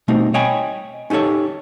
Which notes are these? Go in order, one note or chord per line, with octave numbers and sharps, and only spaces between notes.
B2 G3 A3 C4 D#4
C#5 D#5 G5 G#5 B5
C#4 D#4 G4 A4 C#5